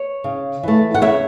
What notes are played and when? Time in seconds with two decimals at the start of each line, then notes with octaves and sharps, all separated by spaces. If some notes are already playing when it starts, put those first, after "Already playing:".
Already playing: C#5
0.24 C#3
0.63 E3 A3
0.94 F#5
1.02 C#3 C#5 E5